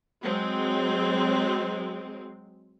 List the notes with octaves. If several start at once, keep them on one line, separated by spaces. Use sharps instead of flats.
F#3 G#3 C4